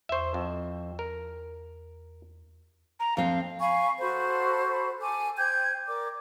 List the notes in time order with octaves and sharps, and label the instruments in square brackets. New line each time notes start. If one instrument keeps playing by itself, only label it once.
[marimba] E2 C#6 [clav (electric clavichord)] C5 E5
[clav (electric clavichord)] F2
A#4
[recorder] A#5
[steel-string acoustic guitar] F2 C4 [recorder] F5
[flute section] F5 G#5 B5 C#6
F#4 A4 C5 B5
A4 G#5 D6
C5 G5 G6 G#6
A#4 D5 D6